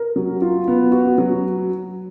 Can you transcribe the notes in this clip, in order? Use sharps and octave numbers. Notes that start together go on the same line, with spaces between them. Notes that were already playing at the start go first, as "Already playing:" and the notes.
Already playing: A#4
F#3
F4
B3
F#4
F#3